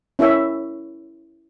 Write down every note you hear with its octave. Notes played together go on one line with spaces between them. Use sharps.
C#4 E4 A#4 C#5 E5